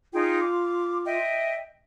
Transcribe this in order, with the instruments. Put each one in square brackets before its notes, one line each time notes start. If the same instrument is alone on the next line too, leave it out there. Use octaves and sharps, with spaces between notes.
[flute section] D#4 G#4 G5 [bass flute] F4
[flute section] D6
D#5 E5 G5